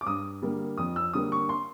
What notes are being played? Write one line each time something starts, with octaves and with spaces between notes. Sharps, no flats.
D6
G2 D#6
D3 G3 A#3
F2 D#6
E6
D3 G3 A#3 D#6
C#6
C6